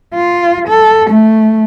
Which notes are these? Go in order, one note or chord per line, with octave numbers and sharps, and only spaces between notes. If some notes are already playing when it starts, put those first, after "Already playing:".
F4
A4
A3